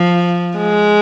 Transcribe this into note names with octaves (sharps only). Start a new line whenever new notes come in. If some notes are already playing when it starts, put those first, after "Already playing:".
Already playing: F3
G#3